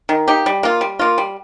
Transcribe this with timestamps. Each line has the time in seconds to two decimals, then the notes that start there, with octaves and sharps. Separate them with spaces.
0.09 D#3
0.28 A#3 D#4 G4
0.46 G3
0.63 A#3 F4
0.81 G3
0.99 A#3 F4
1.18 G3